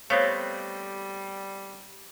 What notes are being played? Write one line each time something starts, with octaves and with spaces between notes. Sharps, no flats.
G3 A3 B3 C4 C5 C#5 F5